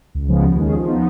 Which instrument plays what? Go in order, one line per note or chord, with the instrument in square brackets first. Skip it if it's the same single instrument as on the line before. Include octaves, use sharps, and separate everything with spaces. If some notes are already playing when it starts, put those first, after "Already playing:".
[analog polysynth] C#2
C#3 F3 G#3 B3
D#2
D#3 G#3 C#4 G#4
F3
B3 D#4